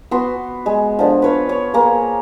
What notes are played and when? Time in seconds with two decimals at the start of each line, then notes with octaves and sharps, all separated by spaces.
0.11 B3 F#4 C6
0.66 G#3
0.99 D3 F3
1.22 B4 C#5 F5
1.49 C#5
1.74 A#3 G#4